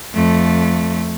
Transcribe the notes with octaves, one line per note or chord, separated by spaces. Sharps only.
F2 A3